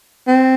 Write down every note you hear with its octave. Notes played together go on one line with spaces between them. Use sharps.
C4